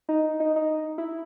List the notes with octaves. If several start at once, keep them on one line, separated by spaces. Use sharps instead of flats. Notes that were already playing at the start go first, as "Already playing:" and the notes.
D#4
D#4
D#4
E4